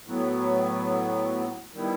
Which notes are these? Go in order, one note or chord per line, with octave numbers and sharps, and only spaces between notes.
A2 F#3 B3
D#3 G3 B3 E4